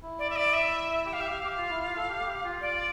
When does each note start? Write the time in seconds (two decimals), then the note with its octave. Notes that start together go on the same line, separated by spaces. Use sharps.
0.02 E4
0.19 D5
0.30 E5
0.36 D5
0.53 E5
1.05 G4 G5
1.13 F5
1.19 G4 E5
1.29 G4 F5
1.44 G4
1.57 F4
1.70 E4
1.83 F4
1.96 A4
2.09 G4
2.26 G4
2.44 F4
2.61 D5